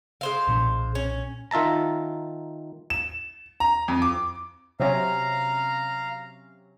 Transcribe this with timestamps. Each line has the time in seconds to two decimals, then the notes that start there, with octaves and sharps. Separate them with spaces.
0.21 G#3 C5 F5
0.47 B1 A#2 D4
0.95 C#4
1.51 D#3 F4 E5 A5 A#5
2.90 E7
3.60 A#5
3.88 F2
4.02 D6
4.80 C3 F#3 C#4 F5 A#5